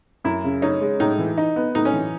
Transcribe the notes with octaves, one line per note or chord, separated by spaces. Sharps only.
F#2 E4
C#3
C#4 D#4
G#3
A2 D#4
E3
D#4
B3
A2 D#4
C#4
E3